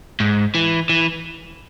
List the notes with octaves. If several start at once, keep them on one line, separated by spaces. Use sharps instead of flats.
G#2
E3
E3